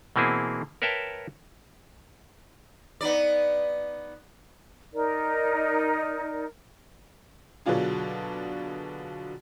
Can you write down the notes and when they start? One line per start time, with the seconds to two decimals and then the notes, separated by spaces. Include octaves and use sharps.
0.16 B2 E3 A#3 C4 E4 G#4
0.82 A#4 B4 C#5 E5 G5 A5
3.01 B3 D#4 D5
4.94 D#4 A#4 D5
7.66 B2 D3 F#3 D4 F4 G#4